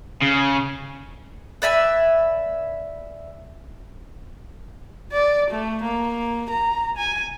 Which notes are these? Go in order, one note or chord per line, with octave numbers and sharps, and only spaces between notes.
C#3
B4 D5 E5 G#5
D5
A3
A#3
A#5
G#5